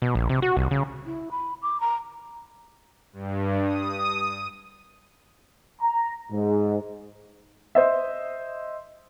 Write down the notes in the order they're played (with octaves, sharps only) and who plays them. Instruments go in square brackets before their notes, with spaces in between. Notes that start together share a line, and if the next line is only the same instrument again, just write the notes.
[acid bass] B2
A#1
C3
F#4
C2
C#3
[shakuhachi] E4
B5
D6
A#5
[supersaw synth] G2
D#6
[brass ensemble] A#5
G#2
[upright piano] C5 D#5 E5